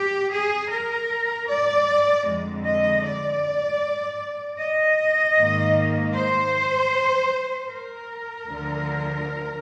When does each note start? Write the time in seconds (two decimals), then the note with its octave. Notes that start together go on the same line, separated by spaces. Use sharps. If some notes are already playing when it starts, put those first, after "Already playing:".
Already playing: G4
0.31 G#4
0.71 A#4
1.48 D5
2.25 F2 D3 G#3
2.64 D#5
3.03 D5
4.58 D#5
5.37 G#2 D#3 A#3
6.14 C5
7.70 A#4
8.47 D2 D3 F3